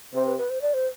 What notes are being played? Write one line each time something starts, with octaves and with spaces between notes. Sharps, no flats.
C3 C5
B4
B4
C5
D5
C5